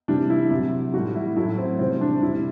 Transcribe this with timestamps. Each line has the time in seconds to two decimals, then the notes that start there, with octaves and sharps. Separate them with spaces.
0.08 C3 E3 G3 D4
0.30 E4
0.51 C3 F#3
0.93 A2 E3 G3 F#4
1.15 E4
1.36 A2 F#3 E4
1.58 C4
1.79 C3 E3 G3 C4
2.01 D4
2.22 C3 G3 E4